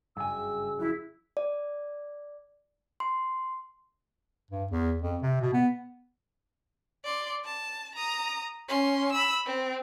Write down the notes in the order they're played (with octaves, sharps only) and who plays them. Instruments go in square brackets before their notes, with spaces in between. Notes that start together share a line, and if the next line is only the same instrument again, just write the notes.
[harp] F#1 [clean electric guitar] G2 G#5 [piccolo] E6
[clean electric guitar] F2 F#3 [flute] E4
[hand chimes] D5
C6
[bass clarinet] G2
E2
F2
C3
B2
B3
[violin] D5 C6
A5
A#5 D#6
C#4 C6
B5 E6
C4